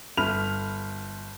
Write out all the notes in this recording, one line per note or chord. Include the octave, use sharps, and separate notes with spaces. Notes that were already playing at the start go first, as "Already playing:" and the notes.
G1 B5 F6 F7